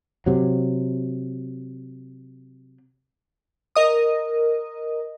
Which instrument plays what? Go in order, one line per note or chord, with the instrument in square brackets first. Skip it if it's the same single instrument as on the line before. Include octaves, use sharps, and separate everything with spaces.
[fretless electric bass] C3 F#3
[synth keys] A#4 D#5 D#6